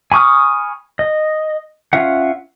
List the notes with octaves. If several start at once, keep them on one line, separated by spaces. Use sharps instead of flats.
G#5 B5 C#6 D#6 F6
D#5
C#4 F4 E5 F#5